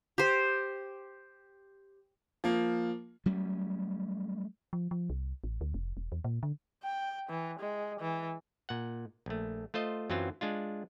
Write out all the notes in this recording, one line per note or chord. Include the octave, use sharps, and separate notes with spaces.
G4 C5
F3 A#3
F#3 G3 A3 C#4
F3
F3
C2
A1
D2
F1
E1
E2
A#2
D3
G5
E3
G#3
E3
A#2 F#5
A#1 A3
A3 F4 C5 D#5
F#2 E3 F#3 C4 F4
G#3 D4 F4